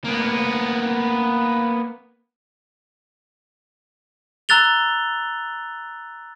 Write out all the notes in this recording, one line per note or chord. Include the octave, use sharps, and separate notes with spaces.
A#3 B3
A#5 E6 F#6 A6 F7 G7